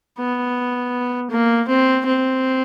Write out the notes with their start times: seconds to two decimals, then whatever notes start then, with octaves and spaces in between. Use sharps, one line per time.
0.18 B3
1.30 A#3
1.68 C4
2.06 C4